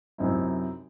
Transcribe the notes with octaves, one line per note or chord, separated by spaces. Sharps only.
F#2 C3 C4 D#4 E4